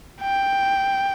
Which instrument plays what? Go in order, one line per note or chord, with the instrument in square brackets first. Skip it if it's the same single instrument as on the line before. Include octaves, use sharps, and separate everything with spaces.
[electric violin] G5